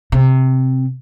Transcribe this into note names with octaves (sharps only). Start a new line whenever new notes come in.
C3